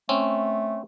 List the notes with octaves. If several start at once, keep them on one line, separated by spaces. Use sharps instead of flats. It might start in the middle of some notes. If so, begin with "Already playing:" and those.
A3 C4 C#4